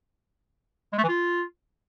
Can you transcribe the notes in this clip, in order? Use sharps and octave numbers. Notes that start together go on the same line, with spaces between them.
G#3
A3
E3
F4